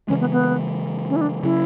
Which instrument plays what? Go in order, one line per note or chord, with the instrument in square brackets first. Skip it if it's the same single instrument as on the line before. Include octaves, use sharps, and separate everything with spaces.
[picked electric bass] C#3 E3 G#3 [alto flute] C#4
[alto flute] B3
B3
C#4
E4
D4
[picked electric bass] C#3 F#3 C#4 [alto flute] E4